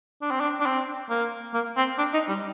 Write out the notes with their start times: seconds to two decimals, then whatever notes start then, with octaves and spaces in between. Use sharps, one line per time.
0.22 D4
0.31 C4
0.40 D4
0.60 D4
0.66 C4
1.10 A#3
1.54 A#3
1.77 C4
1.98 D4
2.13 D#4
2.28 G3